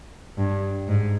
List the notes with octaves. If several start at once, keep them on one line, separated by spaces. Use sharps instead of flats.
G2
G#2